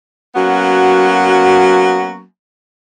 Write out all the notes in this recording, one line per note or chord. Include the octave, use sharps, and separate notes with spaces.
F#3 A#3 B3 C#4 F#4